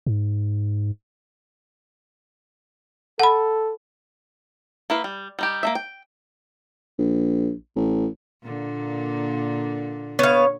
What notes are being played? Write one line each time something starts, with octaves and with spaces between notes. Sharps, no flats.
G#2
A4 F#5 B5
A#3 E4 B4 F5
G3
G3 D#4 G4
A#3 D#4 E5
G5
A#1
A1
A#2 D3 A#3
B3 C#5 F5